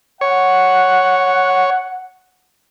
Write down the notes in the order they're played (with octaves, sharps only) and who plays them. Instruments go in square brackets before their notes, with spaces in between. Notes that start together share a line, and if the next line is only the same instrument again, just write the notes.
[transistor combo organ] C#5 [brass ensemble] F#5